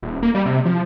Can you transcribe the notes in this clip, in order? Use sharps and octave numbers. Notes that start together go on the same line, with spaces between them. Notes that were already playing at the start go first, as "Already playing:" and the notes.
D#1
A#3
G3
C3
F3